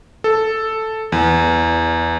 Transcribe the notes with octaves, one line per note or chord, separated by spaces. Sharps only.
A4
E2